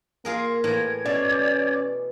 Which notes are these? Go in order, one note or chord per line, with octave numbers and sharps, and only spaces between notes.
A#3 F4 G#4 A#4 F5
A2 E3 A#5 G#6
B2 C#4 D5